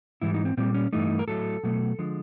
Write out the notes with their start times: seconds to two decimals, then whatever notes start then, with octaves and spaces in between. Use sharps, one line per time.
0.22 G#2 E3 G3 E4
0.34 D#4
0.45 C4
0.57 A#2 G3 C4
0.74 C#4
0.93 G2 E3 A3 D#4
1.19 A#4
1.27 A2 F#3 A3 A4
1.63 B2 F#3 A3
1.99 D3 F3 G#3